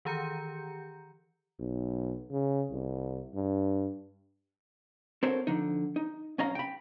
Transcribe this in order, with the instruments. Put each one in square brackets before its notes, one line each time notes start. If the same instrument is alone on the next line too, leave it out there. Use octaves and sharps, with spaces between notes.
[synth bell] D#3 E3 G4 A#5 G6 C#7
[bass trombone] B1
C#3
C2
G2
[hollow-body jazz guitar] C4 F#4 A4 A#4 C5 C#5
D3 F3 D#4
D#4
B1 C#4 D#5 F5 A#5
G5 B5